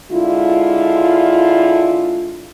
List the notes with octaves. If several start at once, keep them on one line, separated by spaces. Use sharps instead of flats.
D3 G#3 E4 F4